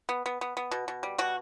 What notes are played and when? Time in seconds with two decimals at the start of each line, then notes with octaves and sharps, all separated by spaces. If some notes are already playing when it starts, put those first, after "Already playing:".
0.09 B3
0.26 B3
0.41 B3
0.57 B3
0.71 B2
0.88 B2
1.03 G3
1.18 B2 F#4